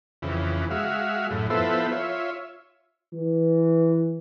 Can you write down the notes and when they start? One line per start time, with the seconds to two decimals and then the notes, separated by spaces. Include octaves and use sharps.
0.22 F2 C#3 E3
0.71 G#3 F#4 E5 F5
1.31 F#2 A2
1.50 F3 B3 E4 A4 C5 E5
1.92 F4 C#5 E5
3.13 E3